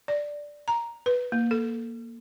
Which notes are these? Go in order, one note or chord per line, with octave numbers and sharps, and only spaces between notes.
D5
A#5
B4
A#3
A4